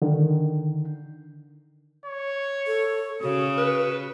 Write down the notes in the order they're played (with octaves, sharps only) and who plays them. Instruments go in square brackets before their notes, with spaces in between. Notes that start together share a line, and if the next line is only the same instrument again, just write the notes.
[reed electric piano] D3 D#3
[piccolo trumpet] C#5
[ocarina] A4
[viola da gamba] C#3 [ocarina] F#4 [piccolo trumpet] D#6
[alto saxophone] B4